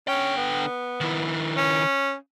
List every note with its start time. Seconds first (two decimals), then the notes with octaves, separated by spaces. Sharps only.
0.08 D3 C#4 G5
0.37 B3
1.01 D#3 E4
1.57 C#4